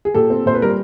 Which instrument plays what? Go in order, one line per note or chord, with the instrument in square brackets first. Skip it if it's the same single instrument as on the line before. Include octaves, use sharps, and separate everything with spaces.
[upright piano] G#4
A#2 G4 A4
C4
A#2 C5
B4
G3 A#4